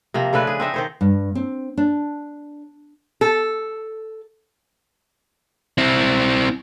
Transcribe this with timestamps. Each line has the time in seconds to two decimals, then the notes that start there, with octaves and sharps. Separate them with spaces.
0.14 C3 F3 A#3
0.33 C#3 A3 D4 B4
0.47 G#4
0.60 C4 D#4 E5
0.74 D#3 C5 C#5
1.01 G2
1.35 C4
1.77 D4
3.21 A4
5.78 C4 E4